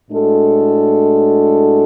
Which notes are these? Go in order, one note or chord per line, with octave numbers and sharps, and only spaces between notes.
A2 G#3 D4 F#4 A4